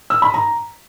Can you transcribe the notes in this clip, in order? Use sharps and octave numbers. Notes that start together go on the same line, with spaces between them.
E6
B5
A#5